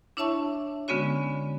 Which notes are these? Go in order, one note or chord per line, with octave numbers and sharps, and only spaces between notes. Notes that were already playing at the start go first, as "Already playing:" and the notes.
D4 E4 C#5 E5 A5 C#6
D3 G#3 B3 C#4 F#4 C#5